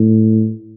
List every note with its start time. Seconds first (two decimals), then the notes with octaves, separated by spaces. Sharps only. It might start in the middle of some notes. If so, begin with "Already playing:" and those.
Already playing: A2